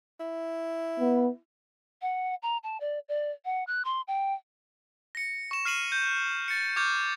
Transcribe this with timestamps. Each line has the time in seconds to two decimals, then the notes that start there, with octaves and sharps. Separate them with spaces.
0.20 E4
1.00 B3
2.02 F#5
2.42 A#5
2.63 A5
2.80 D5
3.09 D5
3.45 F#5
3.67 F#6
3.85 C6
4.08 G5
5.15 A#6 C#7
5.51 C#6 E7
5.65 F6 C7 D#7 F#7
5.92 G6
6.48 A6 C#7
6.76 C#6 D6 F6 G6 G#6